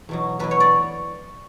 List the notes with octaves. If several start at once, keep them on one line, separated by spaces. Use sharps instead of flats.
E2 B2 F#3
E2 B2 F#3 B4
C#5
D5